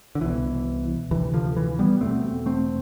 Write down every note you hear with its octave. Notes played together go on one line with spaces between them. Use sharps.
D3
C2 B2 E3
D2 C3 E3
D3 F3
E3
G3 B3
E2 B2 A3 C4
A3 C4